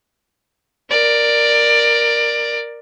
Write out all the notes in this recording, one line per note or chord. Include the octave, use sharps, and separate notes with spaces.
A#4 D5